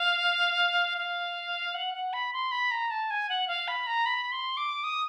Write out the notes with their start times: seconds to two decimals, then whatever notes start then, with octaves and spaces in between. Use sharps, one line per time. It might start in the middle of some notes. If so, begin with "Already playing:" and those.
Already playing: F5
0.98 F5
1.74 F#5
1.94 F#5
2.13 B5
2.33 C6
2.51 B5
2.71 A#5
2.90 A5
3.10 G#5
3.29 F#5
3.48 F5
3.68 B5
3.87 A#5
4.06 B5
4.32 C6
4.57 D6
4.84 D#6